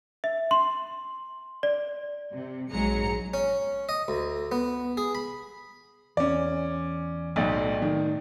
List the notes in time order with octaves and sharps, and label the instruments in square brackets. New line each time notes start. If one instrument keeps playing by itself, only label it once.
[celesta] E5
C6
D5
[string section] C3
A#1 G#2 F#3 G#3 A#5 C#7
[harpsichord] C#4
D#5
D2
B3
G#4
B5
[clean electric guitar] E2 [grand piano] C#4 D5
[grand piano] B1 [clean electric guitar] A2 D5 G5
[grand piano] D#3